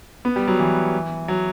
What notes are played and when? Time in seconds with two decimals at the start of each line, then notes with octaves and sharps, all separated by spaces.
0.25 B3
0.36 G3
0.48 F#3
0.60 E3
1.28 F#3